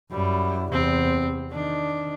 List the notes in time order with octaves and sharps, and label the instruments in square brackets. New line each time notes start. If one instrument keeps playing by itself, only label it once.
[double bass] F#2 E4 [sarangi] G3
[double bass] E2 C3 [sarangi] C4
[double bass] D#3 [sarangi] D4